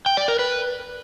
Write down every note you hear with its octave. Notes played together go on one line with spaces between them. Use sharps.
G5
D5
A#4
B4